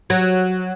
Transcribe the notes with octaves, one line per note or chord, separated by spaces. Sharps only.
F#3